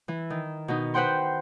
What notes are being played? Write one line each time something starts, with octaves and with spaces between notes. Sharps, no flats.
E3
D#3
B2 D#4
B4 C5 F#5 G5 C6